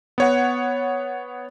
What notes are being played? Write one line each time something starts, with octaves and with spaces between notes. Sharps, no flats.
B3 C#5 F#5